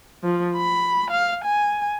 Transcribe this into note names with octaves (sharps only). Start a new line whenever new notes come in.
F3
B5
F5
G#5